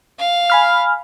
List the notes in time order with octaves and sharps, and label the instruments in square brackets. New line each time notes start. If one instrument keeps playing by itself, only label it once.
[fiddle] F5
[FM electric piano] G#5 B5 F6